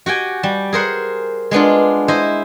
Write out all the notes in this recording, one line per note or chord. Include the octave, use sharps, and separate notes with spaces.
F#4 G4 G5 G#5
G3
G#4 A#4 C5 F#5
G#3 B3 D4 F4
E4 C5 D#5